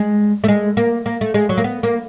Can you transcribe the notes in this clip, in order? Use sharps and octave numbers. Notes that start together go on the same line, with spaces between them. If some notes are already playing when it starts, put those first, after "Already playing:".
Already playing: G#3
A3
G#3
A#3
A#3
A3
G#3
F#3
A#3
B3
A#3